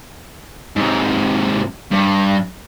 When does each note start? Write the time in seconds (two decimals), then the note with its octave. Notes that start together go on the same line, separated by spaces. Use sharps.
0.76 G#2 C3
1.91 G2